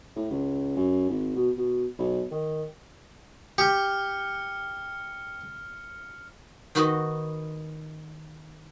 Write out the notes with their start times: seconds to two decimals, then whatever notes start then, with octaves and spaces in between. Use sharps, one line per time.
0.16 A2
0.31 C#2
0.77 F#2
1.09 G#1
1.36 B2
1.57 B2
1.99 B1
2.31 D#3
3.58 G4 F6 C#7
6.75 D#3 D#4 F#4 B4 D#5